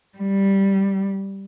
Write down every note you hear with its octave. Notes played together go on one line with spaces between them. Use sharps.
G3